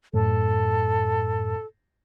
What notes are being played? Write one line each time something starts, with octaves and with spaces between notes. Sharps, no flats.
F#2 A2 A4